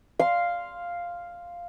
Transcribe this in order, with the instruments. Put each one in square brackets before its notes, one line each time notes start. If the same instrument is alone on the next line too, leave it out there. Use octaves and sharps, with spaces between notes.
[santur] F5 C6